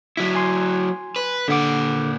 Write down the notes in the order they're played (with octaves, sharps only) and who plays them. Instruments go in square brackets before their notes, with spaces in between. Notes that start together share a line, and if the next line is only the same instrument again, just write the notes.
[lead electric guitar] F#3 E4 [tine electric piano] B6
[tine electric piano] G#5 C6
[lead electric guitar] B4
[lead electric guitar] A#2 F#5 [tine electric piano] D3 D6